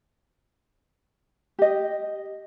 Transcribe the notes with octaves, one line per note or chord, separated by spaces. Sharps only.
G4 D#5